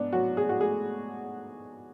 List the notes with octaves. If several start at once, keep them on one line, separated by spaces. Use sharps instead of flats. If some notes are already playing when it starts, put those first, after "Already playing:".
Already playing: G#2 B3 D4
F#3 F#4
G#4
F#4
A3 G#4